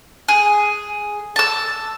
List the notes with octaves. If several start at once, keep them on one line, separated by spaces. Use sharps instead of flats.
G#4
A5 E6